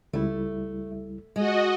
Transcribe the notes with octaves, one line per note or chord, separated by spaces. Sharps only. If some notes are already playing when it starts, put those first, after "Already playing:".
C#2 G3 A3 E4
G#3 F#4 D#5